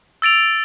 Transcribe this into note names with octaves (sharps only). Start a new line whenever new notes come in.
E6 A6 D7 F7